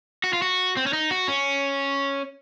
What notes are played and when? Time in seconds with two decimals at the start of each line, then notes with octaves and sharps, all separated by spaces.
0.24 F#4
0.33 F4
0.42 F#4
0.77 C4
0.86 C#4
0.93 D#4
1.11 F#4
1.28 C#4